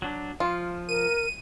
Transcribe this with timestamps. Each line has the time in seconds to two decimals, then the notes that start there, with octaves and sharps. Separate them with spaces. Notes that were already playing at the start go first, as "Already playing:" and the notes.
0.02 F#3 D4
0.40 F3 F4
0.89 A#4 D#7